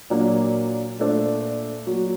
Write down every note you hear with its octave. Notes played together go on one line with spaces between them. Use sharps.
A#2 F#3 A#3 D4
A#2 A3 D4 A4 C5
F#3 A#3 F#4